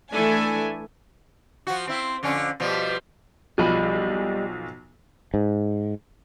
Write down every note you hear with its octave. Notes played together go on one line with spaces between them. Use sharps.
E3 A3 D4 E4 A4 G#5
F3 F#4
C4 E4
F2 D3 C#4
B2 F3 G3
B1 F3 G3 D#5 B5
G#2